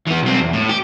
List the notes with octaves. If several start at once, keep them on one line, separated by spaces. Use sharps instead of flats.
E3 B3
B1 C4
E2
A2
G4